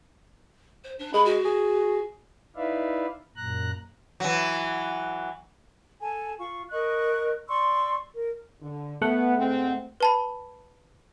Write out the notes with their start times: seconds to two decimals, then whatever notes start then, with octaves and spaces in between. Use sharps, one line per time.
0.84 C5
0.99 D4
1.14 G#3 B5
1.25 F#4
1.45 G#4
2.56 D#4 E4 B4 D5 E5 F5
3.36 F#2 A#2 A#5 F#6
4.20 E3 F#3
6.00 A4 G#5 A5
6.38 F4 C#6
6.70 A#4 D#5 C#6 F#6
7.48 D5 C6 C#6 E6
8.13 A#4
8.60 D3
9.02 A3 B3 F#5
9.36 G#2 C4
10.00 B4 A5 B5